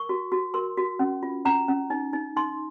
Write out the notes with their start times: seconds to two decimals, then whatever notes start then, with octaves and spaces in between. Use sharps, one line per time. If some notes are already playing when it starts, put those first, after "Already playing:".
Already playing: A#4 C#6
0.09 F#4
0.32 F#4
0.54 A#4 C6
0.77 F#4
0.99 C#4
1.23 F4
1.45 C#4 A#5
1.68 C#4
1.90 D#4
2.13 D#4
2.36 D#4 C6